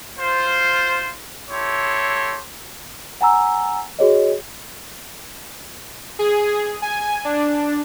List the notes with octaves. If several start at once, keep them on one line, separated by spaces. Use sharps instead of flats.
F4 C5
E4 G4 A4 C#5 C6
F#5 G#5 A#5 E6
F#4 G#4 C#5 D#5
G#4
G#5
D4